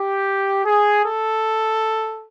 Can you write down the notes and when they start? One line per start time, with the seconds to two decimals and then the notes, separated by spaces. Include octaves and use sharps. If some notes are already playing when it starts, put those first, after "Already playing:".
Already playing: G4
0.65 G#4
1.04 A4